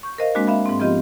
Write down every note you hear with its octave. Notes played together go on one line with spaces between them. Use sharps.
C#6 G6
A#4 C5 D#5 F5
G#3 A#3 C4 D4 F#4
E5 F5 B5
G#2 C4
F3 B3 C4 F4 G4 D#5